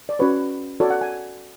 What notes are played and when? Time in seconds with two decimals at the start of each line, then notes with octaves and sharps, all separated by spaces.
0.09 D5
0.19 C#4 F#4 B4 C#5
0.80 F#4 A4 C#5 D5
0.90 F#5
1.01 G#5